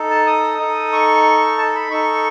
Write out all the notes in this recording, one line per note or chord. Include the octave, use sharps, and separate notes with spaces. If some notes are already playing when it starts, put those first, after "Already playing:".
Already playing: D#4 A4
A5
D#6
D#4 A4
C#6
A5
B5
D#4 A4 C#6